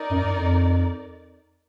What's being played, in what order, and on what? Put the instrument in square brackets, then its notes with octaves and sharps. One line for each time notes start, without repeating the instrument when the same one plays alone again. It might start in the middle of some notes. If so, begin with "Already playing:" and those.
Already playing: [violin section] D#4 A#4 D5
[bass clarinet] F#2
F2